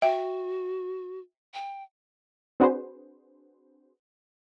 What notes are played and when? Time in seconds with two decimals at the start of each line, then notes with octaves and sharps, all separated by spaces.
0.02 F#4 E5 G5
1.54 G5
2.60 C4 D4 F#4 G#4 B4 C5